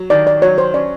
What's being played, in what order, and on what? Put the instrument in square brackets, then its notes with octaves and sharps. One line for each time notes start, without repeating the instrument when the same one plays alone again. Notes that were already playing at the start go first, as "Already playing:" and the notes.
Already playing: [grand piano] F#3
[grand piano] D#3 [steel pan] D5
[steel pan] D5
[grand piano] F#3 [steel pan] C#5
[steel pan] C5
[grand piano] C#4 [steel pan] D5